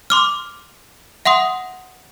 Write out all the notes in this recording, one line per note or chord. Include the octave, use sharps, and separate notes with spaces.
C6 D6 F6
E5 F#5 C6 D#6